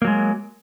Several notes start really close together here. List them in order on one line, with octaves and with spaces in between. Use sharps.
A#3 F#3 G#3